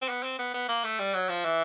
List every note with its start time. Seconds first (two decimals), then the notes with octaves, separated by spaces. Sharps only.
0.02 C4
0.09 B3
0.23 C4
0.39 B3
0.54 B3
0.69 A#3
0.84 A3
0.99 G3
1.14 F#3
1.29 F3
1.45 E3